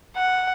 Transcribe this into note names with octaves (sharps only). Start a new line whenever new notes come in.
F#5